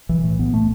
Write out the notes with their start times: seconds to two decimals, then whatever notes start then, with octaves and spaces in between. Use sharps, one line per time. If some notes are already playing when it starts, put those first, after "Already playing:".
0.09 B1 E3
0.24 A2
0.39 B1 B3
0.54 A2 A3